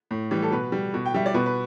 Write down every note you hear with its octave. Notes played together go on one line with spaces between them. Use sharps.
A2
E3 G3
A4
B2 B4
G3
B2
G5
G3 E5
D5
B2 B4
B4